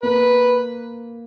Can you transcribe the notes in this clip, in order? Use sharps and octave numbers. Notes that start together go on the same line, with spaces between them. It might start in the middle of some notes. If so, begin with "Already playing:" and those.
A#3 B4